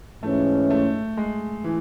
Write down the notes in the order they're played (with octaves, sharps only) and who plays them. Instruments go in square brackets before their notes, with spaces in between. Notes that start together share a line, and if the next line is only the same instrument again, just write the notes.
[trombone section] G#2 E3 G#3 C#4 [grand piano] A3
[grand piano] A3
G#3
E3